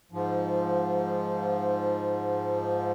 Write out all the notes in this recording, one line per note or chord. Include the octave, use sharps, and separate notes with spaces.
G#2 F3